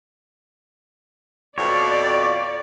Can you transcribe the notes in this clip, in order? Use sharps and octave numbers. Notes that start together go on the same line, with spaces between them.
F2 B2 C#5 D5